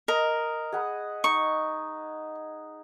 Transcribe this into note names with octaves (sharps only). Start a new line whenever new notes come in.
A#4 D#5
G#4 F#5 B5
D#4 C#6